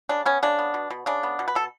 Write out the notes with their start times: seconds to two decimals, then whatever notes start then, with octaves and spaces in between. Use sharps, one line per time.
0.09 C#3 D4
0.26 B3 C#4
0.43 C#3 D4
0.59 B3
0.74 B2
0.90 B2
1.06 C#3 D4
1.23 B3
1.39 B2
1.48 B4
1.55 B2 A4